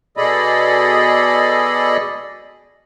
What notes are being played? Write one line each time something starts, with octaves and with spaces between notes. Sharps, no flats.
B2 G#4 A4 D5 D#5 B5